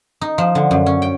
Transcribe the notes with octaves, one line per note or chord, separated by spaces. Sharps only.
D#4
F3
D3
F#2
C#4
G5